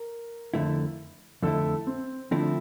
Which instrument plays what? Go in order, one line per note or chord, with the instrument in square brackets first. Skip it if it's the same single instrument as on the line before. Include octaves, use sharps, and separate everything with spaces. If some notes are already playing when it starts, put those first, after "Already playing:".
Already playing: [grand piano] A#4
[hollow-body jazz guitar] F2 D3 A3 E4
[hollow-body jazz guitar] F2 D3 A3 E4 [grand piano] A4
[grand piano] C4
[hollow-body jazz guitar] D3 F3 A3 C4 E4 [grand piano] D4